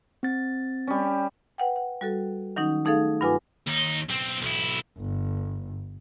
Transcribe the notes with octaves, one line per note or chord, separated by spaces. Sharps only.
C4 A6
G3 C#4
B4 F#5 G5
F#5
G3 F#4 A4
D#3 F#3 C#4 D#4
A3 D#4 G#4 A4 F5
G2 F#3 F4 B4 G#5 D6
D#2 D#4
B1 C4
B1 E4
G1